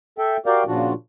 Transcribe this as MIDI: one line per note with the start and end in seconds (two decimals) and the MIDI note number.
0.18 0.37 69
0.18 0.37 76
0.18 0.37 79
0.46 0.64 66
0.46 0.64 67
0.46 0.64 70
0.46 0.64 74
0.46 0.64 77
0.46 0.64 79
0.67 0.93 46
0.67 0.93 49
0.67 0.93 53
0.67 0.93 62
0.67 0.93 65
0.67 0.93 66